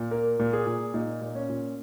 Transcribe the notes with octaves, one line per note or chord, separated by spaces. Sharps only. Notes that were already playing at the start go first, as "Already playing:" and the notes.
Already playing: A#2
A#3 A#4
A#2
G#4
A#2
A#2 D#4
A#2
C#4
A#2